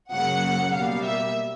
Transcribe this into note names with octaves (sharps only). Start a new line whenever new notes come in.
F#2 C#3 F#3 A#3 F#5
B2 G3 A#3 F5
E5